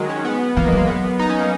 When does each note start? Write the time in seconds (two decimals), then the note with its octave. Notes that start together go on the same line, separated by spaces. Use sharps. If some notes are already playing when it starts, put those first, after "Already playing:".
Already playing: D#3 F#3 G#3
0.09 C#4
0.25 B3
0.57 E3 A#3
0.67 G#3
0.72 F#3 A#3
0.88 B3
1.19 D#4
1.30 C#4
1.40 A#3